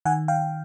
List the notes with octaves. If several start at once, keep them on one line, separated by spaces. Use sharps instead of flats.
D#3 F#5 G#5
F5 G5